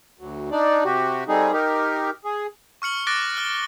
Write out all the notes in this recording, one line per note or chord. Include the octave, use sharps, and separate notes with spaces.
D2 F#3
D4 D#4 D5
C3 F#4 G4
G3 A3 C4 D#4 G#4
D#4 G4 A#4
G#4
C#6 F6 C#7 F#7
D6 F#6 A6 A#6 D7
F6 G7